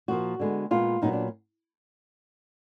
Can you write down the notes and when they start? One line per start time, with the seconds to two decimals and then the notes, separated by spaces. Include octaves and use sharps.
0.08 A#2 F3 A#3 F#4
0.39 D3 G#3 B3
0.71 A#2 G#3 B3 F4
1.02 A#2 F#3 B3 D#4
1.13 D4